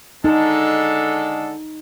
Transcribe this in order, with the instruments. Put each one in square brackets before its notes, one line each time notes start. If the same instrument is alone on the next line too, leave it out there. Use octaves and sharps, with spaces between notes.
[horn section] D3 G#3 A4 [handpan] D#4